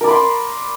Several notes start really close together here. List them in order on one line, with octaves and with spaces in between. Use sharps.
A#4 D5 B5 C6